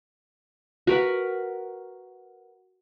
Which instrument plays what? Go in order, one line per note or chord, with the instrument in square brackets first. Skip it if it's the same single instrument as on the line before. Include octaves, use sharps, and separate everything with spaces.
[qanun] F#4 A#4 B4 F#5